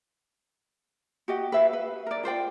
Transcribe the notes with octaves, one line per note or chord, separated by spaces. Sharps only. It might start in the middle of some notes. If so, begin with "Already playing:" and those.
F#4 G4 D#5 F#5
B4 E5 F5
B4
A#4 D5
F4 C5 D5 G5